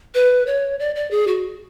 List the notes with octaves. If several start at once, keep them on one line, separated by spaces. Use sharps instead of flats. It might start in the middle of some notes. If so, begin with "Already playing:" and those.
B4
C#5
D5
D5
G#4
F#4